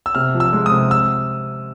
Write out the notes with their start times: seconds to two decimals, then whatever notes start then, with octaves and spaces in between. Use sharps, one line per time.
0.06 E6
0.15 C3 F6
0.34 F3
0.40 E6
0.53 G#3
0.66 D#6
0.72 C3
0.91 E6